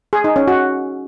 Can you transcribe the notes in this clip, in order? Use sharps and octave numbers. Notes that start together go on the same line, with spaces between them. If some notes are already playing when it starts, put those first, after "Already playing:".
G#4
D#4
C#4
F#4